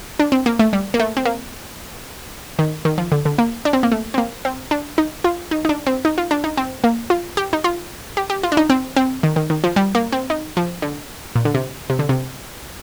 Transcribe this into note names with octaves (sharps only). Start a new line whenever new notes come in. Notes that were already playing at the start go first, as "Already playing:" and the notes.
D4
C4
A#3
A3
G3
A#3
A3
C4
A#3
D#3
D#3
F3
D3
D3
A#3
D4
C4
A#3
A3
C4
A#3
C4
D4
D#4
F4
D#4
D#4
D4
C4
D#4
F4
D4
D#4
C4
A#3
F4
G4
D#4
F4
G4
G4
F4
D4
D#4
C4
C4
D#3
D#3
D#3
F3
G3
A#3
C4
D#4
F3
D3
A#2
D3
C3
C3
D3
C3